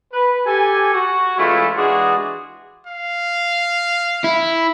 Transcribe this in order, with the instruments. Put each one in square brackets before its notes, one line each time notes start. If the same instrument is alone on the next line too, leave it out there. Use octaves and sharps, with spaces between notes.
[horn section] B4
G4 A4 G#5
F#4
E3 G#3 A3 C#4 E4 F4
E3 G#3 D4 F4 F#4 G#4
[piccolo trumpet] F5
[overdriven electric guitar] E4